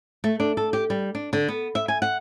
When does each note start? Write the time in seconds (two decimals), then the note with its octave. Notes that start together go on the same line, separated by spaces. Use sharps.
0.24 A3
0.40 D4
0.57 A4
0.73 G4
0.90 G3
1.15 D4
1.33 D3
1.48 B3
1.75 E5
1.88 G#5
2.02 F#5